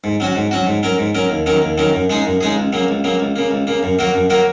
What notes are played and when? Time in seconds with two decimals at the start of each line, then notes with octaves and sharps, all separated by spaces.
0.04 G#2
0.20 F#3 C#4 F#4
0.35 G#2
0.51 F#3 C#4 F#4
0.67 G#2
0.83 F#3 C#4 A#4
0.98 G#2
1.15 F#3 C#4 A#4
1.30 D#2
1.46 D#3 F#3 C#4 A#4
1.62 D#2
1.78 D#3 F#3 C#4 A#4
1.93 F#2
2.10 C#3 G#3 D#4 G#4
2.25 F#2
2.41 C#3 G#3 D#4 G#4
2.56 C#2
2.73 C#3 F#3 A#3
2.88 C#2
3.04 C#3 F#3 A#3
3.20 C#2
3.36 C#3 A#3
3.51 C#2
3.67 C#3 A#3
3.83 F#2
3.99 F#3 A#3 F#4 A#4
4.14 F#2
4.30 F#3 A#3 F#4 A#4